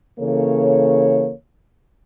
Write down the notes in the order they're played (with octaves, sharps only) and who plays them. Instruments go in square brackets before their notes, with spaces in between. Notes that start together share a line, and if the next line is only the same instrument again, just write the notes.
[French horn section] C#3 E3 A#3 A4 C#5